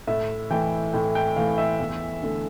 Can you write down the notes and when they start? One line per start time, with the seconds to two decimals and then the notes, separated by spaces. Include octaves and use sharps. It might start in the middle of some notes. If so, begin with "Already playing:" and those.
0.07 A2 E5
0.50 E3 A3 G5
0.93 A2 G5
1.15 G5
1.36 E3 A3 F5
1.58 E5
1.80 E2
2.23 D3 A3